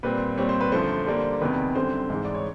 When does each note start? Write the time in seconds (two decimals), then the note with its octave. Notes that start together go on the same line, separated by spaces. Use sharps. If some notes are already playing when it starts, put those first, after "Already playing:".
0.03 A#2 G3 C4 B4
0.37 A#2 G3 C4 C#5
0.49 C5
0.61 B4
0.72 F#2 D3 F3 A3 C5
1.06 D3 G3 A#3 D4
1.41 E2 C3 D#3 B4
1.75 F#2 D3 G3 C4 C5
2.10 G#2 E3 G#3
2.24 D5
2.35 C#5